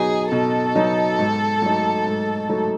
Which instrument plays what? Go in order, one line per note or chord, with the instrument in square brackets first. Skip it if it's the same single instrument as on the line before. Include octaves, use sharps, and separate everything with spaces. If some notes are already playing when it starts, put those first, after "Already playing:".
Already playing: [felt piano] B2 F#3 B3 D#4 [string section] G#4
[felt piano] B2 [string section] A4
[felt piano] F#3 B3 D#4
G#2
F#3 A3 D#4
G#2
F#3 A3 D#4